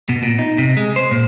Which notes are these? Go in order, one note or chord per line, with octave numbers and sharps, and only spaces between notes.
B2
A#2
D#4
C3
G#3
C5
A#2